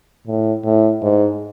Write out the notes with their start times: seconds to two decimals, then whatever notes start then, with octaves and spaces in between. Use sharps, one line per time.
0.27 A2
0.64 A2
1.02 G#2